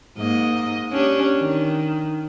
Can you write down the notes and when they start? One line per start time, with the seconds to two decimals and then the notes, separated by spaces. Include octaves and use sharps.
0.17 G#2 A#3 D#5
0.92 C#4 D4 G4
1.39 D#3